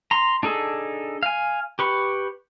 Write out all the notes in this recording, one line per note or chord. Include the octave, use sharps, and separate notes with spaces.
A#5 C6
D4 D#4 G#4 A4
F5 G#5
G4 B4 C#6